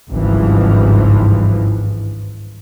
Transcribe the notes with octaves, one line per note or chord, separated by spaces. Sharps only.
G#1 C#2 G2 E3 F3